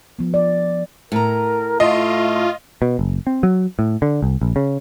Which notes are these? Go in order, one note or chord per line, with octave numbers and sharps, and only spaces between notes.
F3 B3
D5
A2 A#4 A#5
A3 F4 D#5
B2
F#1
C4
F#3
A2
D3
C2
A#1
C#3